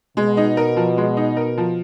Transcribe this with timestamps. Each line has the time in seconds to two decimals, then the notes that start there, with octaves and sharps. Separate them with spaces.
0.17 B2 G#3
0.37 D#4
0.57 A#4
0.76 F3
0.97 G#3
1.17 D#4
1.37 A#4
1.58 F3